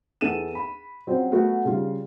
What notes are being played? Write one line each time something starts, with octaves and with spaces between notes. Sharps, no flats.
E2 A4 D#7 E7
B5
F#3 C4 C#4 F4 C5
F#3 A3 B3 F#4
C#3 G3 F4